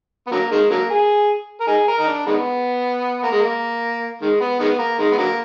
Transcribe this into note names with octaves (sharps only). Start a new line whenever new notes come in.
B3
D3 F#3 A#3
D#3 G#3
D3 F#3 A#3
G#4
A#4
D#4 G#4
A#4
D#4
D4
D#3 G#3 B3
A#3
G#3
A#3
D#3 G#3
B3
D#3 G#3 B3
A#3
D#3 G#3
B3
D3 F#3 A#3